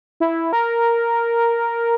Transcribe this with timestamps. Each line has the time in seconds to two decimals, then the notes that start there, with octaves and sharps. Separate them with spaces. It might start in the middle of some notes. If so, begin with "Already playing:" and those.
0.20 E4
0.53 A#4